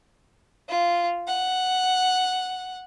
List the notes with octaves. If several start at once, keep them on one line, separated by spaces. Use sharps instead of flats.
F4
F#5